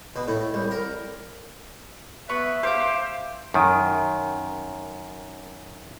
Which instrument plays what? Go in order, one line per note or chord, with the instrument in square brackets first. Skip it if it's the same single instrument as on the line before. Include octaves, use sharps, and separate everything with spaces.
[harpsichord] B2
A2
C2
A#4
[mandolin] B3 C#6 [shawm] B4 [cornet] E5
[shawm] G4 [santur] C5 [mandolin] F5 G6
[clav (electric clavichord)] F#2 D#3